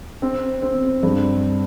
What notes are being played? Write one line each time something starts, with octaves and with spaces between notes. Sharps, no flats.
C4
C4
G2